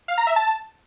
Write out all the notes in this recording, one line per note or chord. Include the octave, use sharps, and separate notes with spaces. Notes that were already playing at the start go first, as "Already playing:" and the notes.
F5
A#5
E5
A5